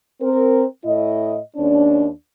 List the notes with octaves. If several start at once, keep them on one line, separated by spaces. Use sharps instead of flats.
C4 A#4
A2 E4 D#5
D#2 C#4 D4